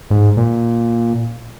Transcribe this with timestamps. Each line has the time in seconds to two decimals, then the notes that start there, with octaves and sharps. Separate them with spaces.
0.11 G#2
0.37 A#2